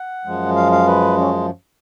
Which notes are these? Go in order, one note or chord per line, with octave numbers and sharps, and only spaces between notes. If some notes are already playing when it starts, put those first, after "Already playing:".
Already playing: F#5
F#2 F3 G#3
F5
F5
B4
C#4